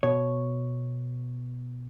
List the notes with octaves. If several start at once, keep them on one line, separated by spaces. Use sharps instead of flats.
B2 C#5